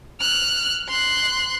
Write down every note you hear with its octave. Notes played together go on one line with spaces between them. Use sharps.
F6 F#6
C6 F#6